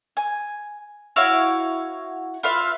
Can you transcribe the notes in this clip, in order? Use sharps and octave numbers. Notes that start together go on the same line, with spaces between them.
G#5
E4 F#4 C#5 F5
F4 B4 E5 F5